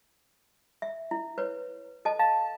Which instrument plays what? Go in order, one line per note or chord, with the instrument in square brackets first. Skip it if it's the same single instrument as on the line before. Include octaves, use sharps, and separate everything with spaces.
[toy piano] E5
E4
B4 C#5
A4 D#5 A5
[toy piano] F5 [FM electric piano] A5